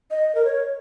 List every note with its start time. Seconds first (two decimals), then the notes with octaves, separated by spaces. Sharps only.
0.11 D#5
0.35 A#4
0.45 C#5